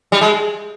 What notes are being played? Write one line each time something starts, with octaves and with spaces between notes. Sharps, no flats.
G3
G#3